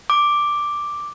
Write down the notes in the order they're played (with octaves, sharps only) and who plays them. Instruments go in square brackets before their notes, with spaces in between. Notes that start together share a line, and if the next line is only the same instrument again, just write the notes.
[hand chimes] D6